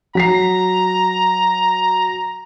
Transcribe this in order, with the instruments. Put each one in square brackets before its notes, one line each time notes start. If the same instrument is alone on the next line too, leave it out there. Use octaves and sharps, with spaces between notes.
[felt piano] F#3 B6 C7 [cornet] A#5